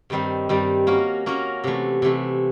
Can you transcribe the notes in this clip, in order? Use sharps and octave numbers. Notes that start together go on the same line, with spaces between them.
G2 D#3 G3 C4
G2 D#3 G3 C4
A#3 C#4 F#4 A#4
A#3 C#4 F#4 A#4
C3 E3 A3
C3 E3 A3